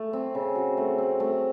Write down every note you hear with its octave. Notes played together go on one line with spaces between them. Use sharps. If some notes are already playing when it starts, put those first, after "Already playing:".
Already playing: A3
C4
C#3
F#4
A3
C4
A3